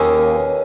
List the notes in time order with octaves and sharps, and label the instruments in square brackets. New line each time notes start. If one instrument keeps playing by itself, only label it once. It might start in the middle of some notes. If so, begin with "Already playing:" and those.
Already playing: [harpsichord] D#2 D#3 A#3 C#4 [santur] D#5
[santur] C#5
B4